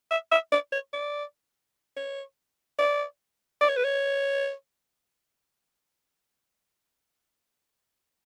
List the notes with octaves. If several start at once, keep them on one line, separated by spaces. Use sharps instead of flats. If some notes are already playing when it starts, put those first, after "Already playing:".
E5
E5
D5
C#5
D5
C#5
D5
D5
C#5
B4
C#5